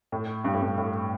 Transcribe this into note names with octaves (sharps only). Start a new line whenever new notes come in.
A2
G2
A2
G2
A2